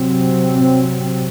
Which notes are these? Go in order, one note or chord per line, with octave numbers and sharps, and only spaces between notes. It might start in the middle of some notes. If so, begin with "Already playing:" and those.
Already playing: C3 F#3 C4